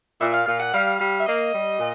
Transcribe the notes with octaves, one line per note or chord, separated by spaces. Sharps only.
A#2 E5
F5
A#2 F5
F#5
G3 F5
G3 F5
E5
A#3 D#5
G3
A#2